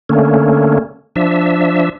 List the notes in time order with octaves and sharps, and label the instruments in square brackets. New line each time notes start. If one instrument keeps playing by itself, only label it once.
[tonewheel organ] D3 A3 A#3 C#4
F3 D4 E5